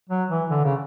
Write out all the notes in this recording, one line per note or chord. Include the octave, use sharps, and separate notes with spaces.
F#3
E3
D3
C#3